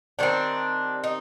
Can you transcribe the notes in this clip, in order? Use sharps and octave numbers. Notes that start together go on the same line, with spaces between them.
D#3 G3 C4 D4
D#4